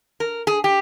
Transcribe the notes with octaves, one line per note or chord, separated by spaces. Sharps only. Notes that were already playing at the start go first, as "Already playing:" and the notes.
A#4
G#4
G4